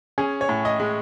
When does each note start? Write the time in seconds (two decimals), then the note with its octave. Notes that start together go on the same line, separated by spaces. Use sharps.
0.18 C#4 G#4
0.41 C#5
0.49 A2
0.65 D#5
0.80 G#3